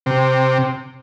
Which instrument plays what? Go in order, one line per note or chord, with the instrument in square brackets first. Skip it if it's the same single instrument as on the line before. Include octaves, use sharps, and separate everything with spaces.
[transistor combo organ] C3